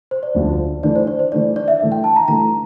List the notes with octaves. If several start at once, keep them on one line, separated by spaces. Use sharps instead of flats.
C5
D5
D2 D3 F3
E3 A3 D4 D5
C5
D5
C5
E3 A3 D4 D5
D5
E5
E3 A3 D4
G5
A5
A#5
E3 A3 D4 A#5